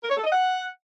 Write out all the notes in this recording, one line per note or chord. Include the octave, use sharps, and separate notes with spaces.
A#4
C#5
A4
D#5
F#5